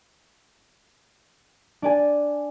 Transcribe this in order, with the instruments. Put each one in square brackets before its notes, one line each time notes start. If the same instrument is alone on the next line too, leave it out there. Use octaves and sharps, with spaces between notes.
[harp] D4 D5 G#5